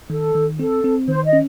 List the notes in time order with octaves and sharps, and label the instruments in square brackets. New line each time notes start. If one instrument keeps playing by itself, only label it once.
[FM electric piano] D#3 [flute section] A4
[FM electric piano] D#3
[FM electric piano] C4 [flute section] A4
[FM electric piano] C4
[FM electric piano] D#3 [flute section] C5
[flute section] D#5
[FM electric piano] C#4